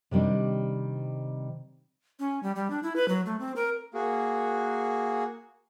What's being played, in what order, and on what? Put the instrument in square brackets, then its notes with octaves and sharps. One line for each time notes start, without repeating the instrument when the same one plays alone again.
[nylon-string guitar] C3 D#3 G3 C4 D4
[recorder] C#4
G3
G3
D4
E4
B4
F#3
A3
C4
A#4
[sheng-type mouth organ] A#3 F#4 G#4